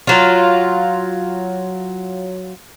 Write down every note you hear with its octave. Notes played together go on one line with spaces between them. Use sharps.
F#3 F4